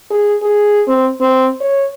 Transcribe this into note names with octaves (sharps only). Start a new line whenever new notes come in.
G#4
G#4
C4
C4
C#5